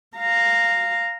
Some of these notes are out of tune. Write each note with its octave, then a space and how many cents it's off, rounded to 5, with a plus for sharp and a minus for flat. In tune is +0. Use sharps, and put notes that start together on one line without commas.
F5 +0 A#5 -10